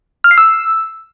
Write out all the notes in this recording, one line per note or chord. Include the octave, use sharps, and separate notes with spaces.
F6
C7
E6